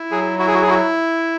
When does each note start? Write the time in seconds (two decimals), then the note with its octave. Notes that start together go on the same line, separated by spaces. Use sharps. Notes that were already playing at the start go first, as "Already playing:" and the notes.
Already playing: E4
0.11 F#3 G#4
0.39 E4 F#4
0.47 G#4
0.54 F#4
0.62 G#4
0.67 E4 F#4